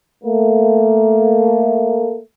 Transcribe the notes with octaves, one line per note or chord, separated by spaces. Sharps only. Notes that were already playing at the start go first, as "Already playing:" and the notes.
A3 A#3